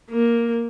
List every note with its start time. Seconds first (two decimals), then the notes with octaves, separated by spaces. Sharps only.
0.10 A#3